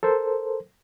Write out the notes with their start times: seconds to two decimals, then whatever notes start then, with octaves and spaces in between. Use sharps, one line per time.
0.03 A4 A#4 C5